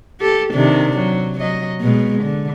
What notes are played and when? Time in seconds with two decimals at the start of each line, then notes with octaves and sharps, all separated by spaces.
0.20 G4 A4
0.54 C3 D#3 D4
0.98 F#3
1.40 F#3 D#5
1.81 B2 G#3
2.23 D3